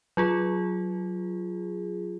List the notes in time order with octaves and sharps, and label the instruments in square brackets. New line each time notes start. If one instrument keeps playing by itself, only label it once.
[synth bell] F#3 F4 G#4